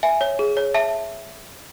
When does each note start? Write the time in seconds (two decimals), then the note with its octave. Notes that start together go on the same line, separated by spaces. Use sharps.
0.03 E5 G#5
0.21 C#5
0.39 G#4
0.57 C#5
0.74 E5 A5